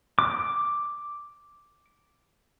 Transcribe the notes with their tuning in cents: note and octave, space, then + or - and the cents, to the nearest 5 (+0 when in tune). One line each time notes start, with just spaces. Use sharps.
D6 +0